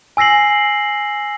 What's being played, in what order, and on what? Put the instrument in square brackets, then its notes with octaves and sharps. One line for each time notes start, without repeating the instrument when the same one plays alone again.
[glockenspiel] G#5 E6 A#6 C7 F#7